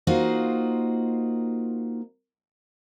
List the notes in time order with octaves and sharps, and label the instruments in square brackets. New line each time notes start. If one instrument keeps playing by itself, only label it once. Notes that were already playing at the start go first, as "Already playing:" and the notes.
[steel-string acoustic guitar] A#3 D#4 F4 F#4 C5